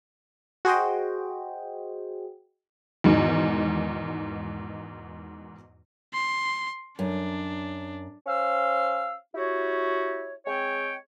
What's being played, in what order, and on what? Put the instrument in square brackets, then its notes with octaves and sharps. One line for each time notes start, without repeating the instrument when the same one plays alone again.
[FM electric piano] F#4 G#4 C5 D#5 G5
[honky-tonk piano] E2 G#2 B2 D#3
[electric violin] C6
[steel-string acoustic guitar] F#2 [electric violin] D4
[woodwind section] C#4 C5 F5 E6
E4 F#4 G4 C#5
G#3 C4 C#5 G5